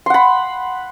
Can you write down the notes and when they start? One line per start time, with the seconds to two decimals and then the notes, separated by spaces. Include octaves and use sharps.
0.06 C6
0.10 F#5
0.14 B5